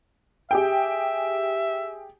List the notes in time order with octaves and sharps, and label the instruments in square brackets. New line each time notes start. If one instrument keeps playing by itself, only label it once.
[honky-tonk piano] G4 G#4 G5 [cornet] E5